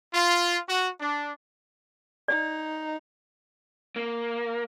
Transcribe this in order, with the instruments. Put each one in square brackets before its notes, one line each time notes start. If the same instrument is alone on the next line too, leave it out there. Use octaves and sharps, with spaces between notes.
[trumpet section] F4
F#4
D4
[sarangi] D#4 [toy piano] D5
[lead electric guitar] A#3